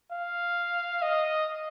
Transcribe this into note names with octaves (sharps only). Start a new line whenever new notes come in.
F5
D#5